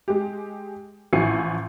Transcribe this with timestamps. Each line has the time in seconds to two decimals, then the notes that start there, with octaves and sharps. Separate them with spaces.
0.08 G#3 G4
1.13 A1 F3 E4 G#5 C7 C#7